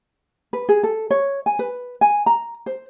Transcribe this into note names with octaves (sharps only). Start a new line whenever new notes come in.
B4
G#4
A4
C#5
G#5
B4
G#5
A#5
C5